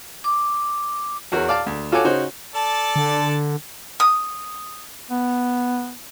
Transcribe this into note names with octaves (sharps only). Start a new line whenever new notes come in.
D6
E2 F#4 A#4 C#5
D5 F5 A5 D6
D2
F4 F#4 A4 C#5 G#5 D6
C#3 D#4 F#4 C5 C#5
A4 D5 A5
D3
D#6
B3